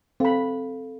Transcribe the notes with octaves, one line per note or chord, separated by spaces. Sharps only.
C4 A4 F5 B5